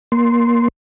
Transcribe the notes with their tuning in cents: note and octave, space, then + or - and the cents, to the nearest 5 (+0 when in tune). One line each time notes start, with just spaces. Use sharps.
A#3 +20 C6 +0